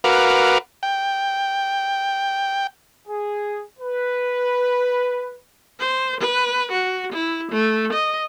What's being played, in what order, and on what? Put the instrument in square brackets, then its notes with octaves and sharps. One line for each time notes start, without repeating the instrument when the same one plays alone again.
[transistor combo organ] F#4 A#4 B4 F5 D6
G5
[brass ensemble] G#4
B4
[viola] C5
B4
F#4
E4
A3
D#5